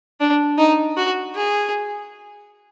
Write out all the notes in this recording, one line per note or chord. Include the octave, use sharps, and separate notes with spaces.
D4
D#4
F#4
G#4